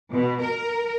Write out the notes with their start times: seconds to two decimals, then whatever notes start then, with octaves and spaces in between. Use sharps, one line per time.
0.13 B2
0.41 A#4